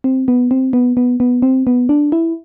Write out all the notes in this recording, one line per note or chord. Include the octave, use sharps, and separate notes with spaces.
C4
B3
C4
B3
B3
B3
C4
B3
D4
E4